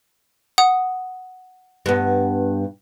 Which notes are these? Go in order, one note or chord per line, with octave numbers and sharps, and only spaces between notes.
F#5 D#6
G2 B3